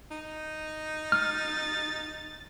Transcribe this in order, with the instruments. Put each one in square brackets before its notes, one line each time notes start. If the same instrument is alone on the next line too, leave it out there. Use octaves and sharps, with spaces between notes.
[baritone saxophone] D#4
[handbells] F6 [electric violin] A6